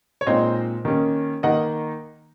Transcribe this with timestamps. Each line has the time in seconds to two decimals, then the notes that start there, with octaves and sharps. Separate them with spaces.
0.21 C#5
0.27 A#2 G#3 C4 D#4 C5 D#5
0.85 D#3 A#3 C#4
1.43 D#3 A#3 D#4 D#5 F#5